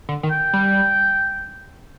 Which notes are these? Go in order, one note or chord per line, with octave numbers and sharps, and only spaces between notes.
D3
D#3
G5
G3